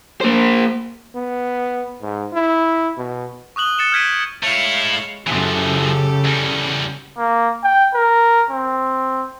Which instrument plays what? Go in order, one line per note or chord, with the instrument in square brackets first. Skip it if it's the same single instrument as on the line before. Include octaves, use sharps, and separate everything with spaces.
[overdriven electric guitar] A#3 C5
[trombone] B3
G#2
E4
B2
[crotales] C#6 D#6 F#6 F#7 G7
F#6 A6 C#7 E7 G7
F6 G6 G#6 B6 D7 D#7
[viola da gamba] G#3 [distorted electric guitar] A3 E4 [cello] C#5 F5
[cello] F#2 [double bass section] C#3 [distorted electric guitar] E3 F3 [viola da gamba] G4 A4
[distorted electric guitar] E2 G3 [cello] C#4
[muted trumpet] A#3
G5
A#4
C4